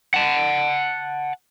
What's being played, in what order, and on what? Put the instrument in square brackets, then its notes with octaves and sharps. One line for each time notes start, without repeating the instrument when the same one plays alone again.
[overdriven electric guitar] F#5 A5